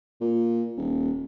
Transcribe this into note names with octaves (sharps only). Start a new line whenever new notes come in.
A#2
D#1